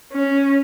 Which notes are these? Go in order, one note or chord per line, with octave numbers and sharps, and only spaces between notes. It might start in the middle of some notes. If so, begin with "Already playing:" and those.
C#4